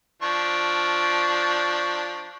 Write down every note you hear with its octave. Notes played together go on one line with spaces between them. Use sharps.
F3 D4 C#6